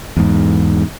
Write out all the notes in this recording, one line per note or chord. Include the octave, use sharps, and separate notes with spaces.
E2 G#2